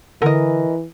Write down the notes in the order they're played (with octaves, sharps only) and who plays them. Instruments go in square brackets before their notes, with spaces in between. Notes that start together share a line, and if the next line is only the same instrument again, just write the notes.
[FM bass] D3 [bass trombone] E3 [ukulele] A#4 D#5